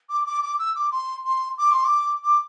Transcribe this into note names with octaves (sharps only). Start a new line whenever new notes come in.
D6
D6
D6
E6
D6
C6
C6
D6
C6
D6
D6